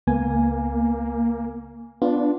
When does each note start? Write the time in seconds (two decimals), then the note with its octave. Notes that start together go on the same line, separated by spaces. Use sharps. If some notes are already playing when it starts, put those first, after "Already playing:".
0.07 C#2 A#3 B3 G#5
2.02 B3 D4 F4